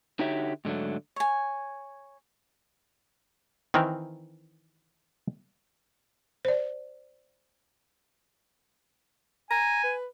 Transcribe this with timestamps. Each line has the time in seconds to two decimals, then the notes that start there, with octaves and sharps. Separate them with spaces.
0.19 D3 D#4 F#4 G4 C#5 E5
0.65 G#2 D3 F#3 A3
1.16 C#5 G#5
3.74 D#3 E3 C4 A#4
6.45 C5 D5
9.51 G#5 A#5
9.84 B4